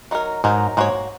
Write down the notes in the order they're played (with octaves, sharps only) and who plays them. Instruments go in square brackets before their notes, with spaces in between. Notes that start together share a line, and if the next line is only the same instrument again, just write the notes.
[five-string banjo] F#3 D#4 A#4
[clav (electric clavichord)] G#2 [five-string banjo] F#3 D#4 A#4
[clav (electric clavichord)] G#2 [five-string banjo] A#3 F#4 C#5